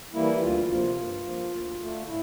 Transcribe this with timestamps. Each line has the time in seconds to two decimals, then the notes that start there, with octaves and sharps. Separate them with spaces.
0.13 E3 G3 A#3 E4
0.41 D2 F4
0.70 C3 F3 A#3
0.97 G2
1.24 F3 A#3
1.52 D2
1.80 D3 A3
2.07 A2 E4